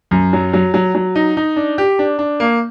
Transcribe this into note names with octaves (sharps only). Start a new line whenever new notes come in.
F#2
F#3
F#3
F#3
F#3
D#4
D#4
D4
G4
D4
D4
A#3